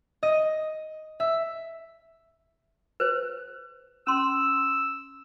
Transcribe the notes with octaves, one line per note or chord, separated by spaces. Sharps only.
D#5
E5
B4 C5
C#4 C6 E6